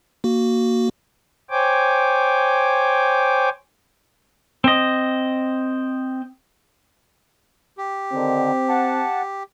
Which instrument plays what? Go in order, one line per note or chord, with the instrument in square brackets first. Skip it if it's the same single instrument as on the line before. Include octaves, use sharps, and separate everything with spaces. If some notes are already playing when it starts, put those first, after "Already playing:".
[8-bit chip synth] A#3 F#4
[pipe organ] C5 C#5 G5 G#5 D6
[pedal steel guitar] C4 D#5
[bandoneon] G4
[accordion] D3 D#3 [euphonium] C4
[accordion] F#5 A5